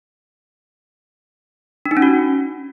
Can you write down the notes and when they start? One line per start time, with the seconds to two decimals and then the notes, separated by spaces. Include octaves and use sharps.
1.86 D4
1.91 D#4
1.97 C#4
2.02 F#4